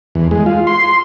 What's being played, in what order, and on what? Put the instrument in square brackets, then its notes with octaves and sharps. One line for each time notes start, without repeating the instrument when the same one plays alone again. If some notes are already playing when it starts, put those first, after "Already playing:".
[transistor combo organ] E2
G#3
F4
C6